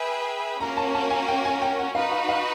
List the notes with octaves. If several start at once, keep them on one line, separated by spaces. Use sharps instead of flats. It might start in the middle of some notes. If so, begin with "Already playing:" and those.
Already playing: G#4 B4 E5 G5
A#3 C#4 F#4 A#4 A#5
A5
A5
G#5
G5
G#5
G5
F#5
D#4 F#4 B4 F5
F5
F5